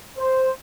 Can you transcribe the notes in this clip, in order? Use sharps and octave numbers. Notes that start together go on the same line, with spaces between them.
C5